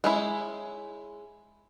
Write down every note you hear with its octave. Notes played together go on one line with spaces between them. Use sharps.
G#3 C#4 E4